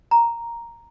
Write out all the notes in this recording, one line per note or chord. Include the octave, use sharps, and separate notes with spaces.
A#5